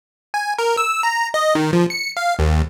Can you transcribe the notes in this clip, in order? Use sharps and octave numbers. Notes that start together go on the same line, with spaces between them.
G#5
A#4
E6
A#5
D#5
D#3
F3
C#7
F5
D#2